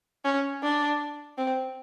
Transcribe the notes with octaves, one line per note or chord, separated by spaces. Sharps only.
C#4
D4
C4